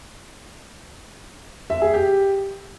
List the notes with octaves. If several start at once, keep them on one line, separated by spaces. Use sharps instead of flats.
E5
G#4
G4